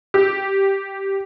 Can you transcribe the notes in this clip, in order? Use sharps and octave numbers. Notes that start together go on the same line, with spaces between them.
G4